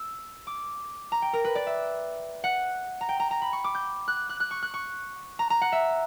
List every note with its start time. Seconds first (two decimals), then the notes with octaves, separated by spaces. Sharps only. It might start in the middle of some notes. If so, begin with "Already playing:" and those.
Already playing: E6
0.47 D6
1.12 A#5
1.22 G5
1.33 A#4
1.45 B4
1.55 D5
1.67 E5
2.44 F#5
3.01 A#5
3.09 G5
3.20 A#5
3.31 A#5
3.42 B5
3.53 C#6
3.64 D6
3.75 G6
4.08 F#6
4.29 F#6
4.40 F#6
4.51 C#6
4.63 F#6
4.74 C#6
5.39 A#5
5.50 A#5
5.62 F#5
5.72 E5